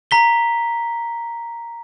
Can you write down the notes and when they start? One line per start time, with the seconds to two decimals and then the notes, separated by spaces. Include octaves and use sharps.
0.11 A#5 B6 G7